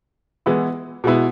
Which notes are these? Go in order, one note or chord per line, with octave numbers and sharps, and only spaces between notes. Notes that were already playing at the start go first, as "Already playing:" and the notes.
E3 G#3 B3 E4
B2 G#3 B3 E4